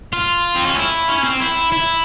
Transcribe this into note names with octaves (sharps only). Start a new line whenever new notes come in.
F4
C4
C#4
E4
C#4
C4
E4
E4